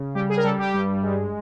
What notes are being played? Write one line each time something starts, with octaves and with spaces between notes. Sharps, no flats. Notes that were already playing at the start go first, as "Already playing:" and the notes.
Already playing: C#3
G3 G4
G#4
A#4
G3 A4
G4
G2
G#3